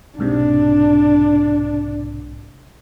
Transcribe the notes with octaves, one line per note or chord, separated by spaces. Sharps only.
B1 G#2 C3 D4